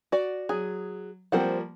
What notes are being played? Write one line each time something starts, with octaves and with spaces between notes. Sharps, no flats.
F#4 D5
F#3 G#4
F3 G3 A#3 C4 C5 F#5